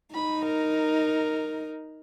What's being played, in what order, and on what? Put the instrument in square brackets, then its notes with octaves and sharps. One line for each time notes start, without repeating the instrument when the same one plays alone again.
[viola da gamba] D#4 [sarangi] B5
[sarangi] A#4